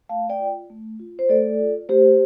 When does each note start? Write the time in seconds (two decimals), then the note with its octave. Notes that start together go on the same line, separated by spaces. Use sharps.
0.09 A3 F5 A5
0.30 D5 G5
0.40 F4
0.70 A3
0.99 F4
1.19 C5
1.29 A3 A4 D5
1.60 F4
1.89 A3 G4 C5